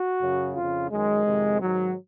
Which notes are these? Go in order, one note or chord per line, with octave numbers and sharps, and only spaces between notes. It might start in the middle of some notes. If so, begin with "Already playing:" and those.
Already playing: F#4
F#2 C#3
F2 C#3 F4
F#2 D#3 G#3
F2 C3 D#3
G#2 D#3 F#3